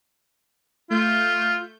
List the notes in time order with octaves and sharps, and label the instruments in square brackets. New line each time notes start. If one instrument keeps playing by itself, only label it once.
[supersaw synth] A3 G6 [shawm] F4